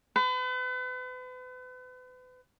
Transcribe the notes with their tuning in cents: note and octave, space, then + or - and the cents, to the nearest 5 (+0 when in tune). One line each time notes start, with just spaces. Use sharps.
B4 +40